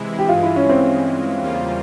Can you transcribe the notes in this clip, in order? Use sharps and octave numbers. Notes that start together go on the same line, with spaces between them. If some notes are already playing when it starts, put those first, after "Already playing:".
Already playing: C3 E3 G#3 E4
G4
G2 E3 G#3 F4
E4
C#4
C4
E2 C#3 G3 A#3 F4